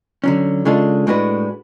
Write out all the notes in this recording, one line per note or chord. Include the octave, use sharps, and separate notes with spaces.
D3 F#3 C#4
C#3 G#3 D4 F4 A4
A2 G#3 D4 F#4 B4